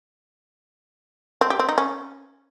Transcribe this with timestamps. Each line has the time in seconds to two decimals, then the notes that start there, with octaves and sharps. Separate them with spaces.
1.41 C4
1.50 G4
1.59 C4
1.69 D#4
1.78 C#4